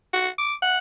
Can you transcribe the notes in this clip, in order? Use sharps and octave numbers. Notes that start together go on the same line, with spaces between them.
F#4
D6
F#5